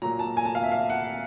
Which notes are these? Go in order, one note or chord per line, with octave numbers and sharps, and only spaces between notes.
A#2 F#3 A#5
A5
G#5
A5
F5
E5
F5
F#5